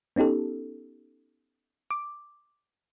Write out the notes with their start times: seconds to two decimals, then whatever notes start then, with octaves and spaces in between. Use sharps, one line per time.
0.16 B3 C#4 D#4 G4 A4
1.91 D6